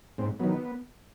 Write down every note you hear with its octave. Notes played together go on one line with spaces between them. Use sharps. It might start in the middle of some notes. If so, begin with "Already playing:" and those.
G#2 C4
D#3 F#3 B3